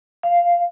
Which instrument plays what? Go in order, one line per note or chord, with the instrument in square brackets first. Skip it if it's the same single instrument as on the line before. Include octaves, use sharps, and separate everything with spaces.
[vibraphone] F5